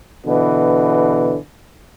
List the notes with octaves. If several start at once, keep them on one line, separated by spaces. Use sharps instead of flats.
B2 D3 E3